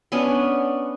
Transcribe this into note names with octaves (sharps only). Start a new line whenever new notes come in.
B3 C#4 D4